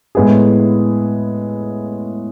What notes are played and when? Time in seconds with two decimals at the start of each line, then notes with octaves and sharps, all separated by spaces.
0.15 A2 G#3 B3 E4 G#4